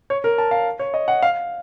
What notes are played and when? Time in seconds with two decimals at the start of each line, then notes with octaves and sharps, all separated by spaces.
0.10 C#5
0.24 A#4
0.38 A5
0.51 F5
0.79 C#5
0.94 D#5
1.08 F#5
1.22 F5